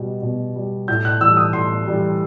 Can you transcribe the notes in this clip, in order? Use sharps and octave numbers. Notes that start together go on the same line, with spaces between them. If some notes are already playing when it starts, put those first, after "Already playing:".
Already playing: B2 G3
B2
G3
A2 G6
F#6
E3 G3 E6
D#6
A2 C6
E3 G3